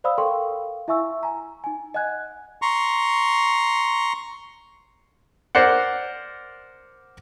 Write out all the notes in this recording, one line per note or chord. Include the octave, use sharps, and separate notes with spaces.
C5 D5 F5 B5 D#6 E6
A4 A#4 F5 G5 C6 C#6
E4 E5 G#5 C#6 E6
G#5 A#5
D#4 G#5
D#5 F#5 G#5 F#6 G#6
A#5 C6 C#6
A#4 C5 D5 F#5